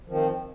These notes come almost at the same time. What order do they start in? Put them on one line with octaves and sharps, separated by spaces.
F3 D#3 C4